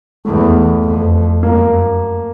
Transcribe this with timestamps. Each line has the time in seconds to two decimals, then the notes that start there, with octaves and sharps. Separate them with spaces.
0.25 E2 A3
0.83 F2
1.42 F#2 A#3